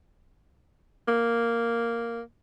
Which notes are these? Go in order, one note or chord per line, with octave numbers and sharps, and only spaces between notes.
A#3